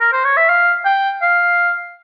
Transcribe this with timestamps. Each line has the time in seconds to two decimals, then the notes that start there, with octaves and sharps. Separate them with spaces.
0.01 A#4
0.13 C5
0.24 C#5
0.37 E5
0.49 F5
0.85 G5
1.22 F5